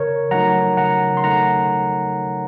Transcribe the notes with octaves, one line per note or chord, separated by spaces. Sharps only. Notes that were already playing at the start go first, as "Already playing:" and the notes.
Already playing: C#3 A#4 C#5
F#3 A3 D#4 F#5 A#5
C#3 F#5 A#5
C6
A3 D#4 F#5 A#5